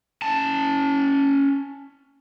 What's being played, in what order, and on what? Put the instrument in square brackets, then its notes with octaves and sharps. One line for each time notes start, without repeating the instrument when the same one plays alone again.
[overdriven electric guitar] C#4 A5